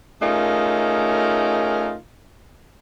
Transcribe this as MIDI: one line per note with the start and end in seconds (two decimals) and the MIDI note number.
0.21 1.94 57
0.21 1.94 61
0.21 1.94 63
0.21 1.94 65
0.21 1.94 68
0.21 1.94 70